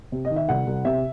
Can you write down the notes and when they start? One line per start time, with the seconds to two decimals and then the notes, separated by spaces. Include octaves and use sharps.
0.12 C3
0.25 D#5
0.31 D#3
0.36 E5
0.49 C2 F#5
0.67 C2
0.85 C3 E5